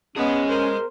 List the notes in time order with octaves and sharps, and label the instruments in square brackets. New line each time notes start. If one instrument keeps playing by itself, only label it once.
[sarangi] B3 [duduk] C#4 [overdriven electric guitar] G#4 D#5
[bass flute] A#4 [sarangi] C5